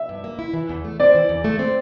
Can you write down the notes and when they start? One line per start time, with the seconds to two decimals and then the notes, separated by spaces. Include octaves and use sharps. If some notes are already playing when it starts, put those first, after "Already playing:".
Already playing: E5
0.09 G2
0.24 A#3
0.39 E4
0.54 E3
0.69 E2
0.85 A3
1.00 C4 D5
1.15 E3
1.29 E2
1.44 A3
1.59 C4